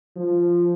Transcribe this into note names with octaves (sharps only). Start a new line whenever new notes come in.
F3